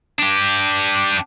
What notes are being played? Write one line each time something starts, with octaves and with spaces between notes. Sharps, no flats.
D4 G4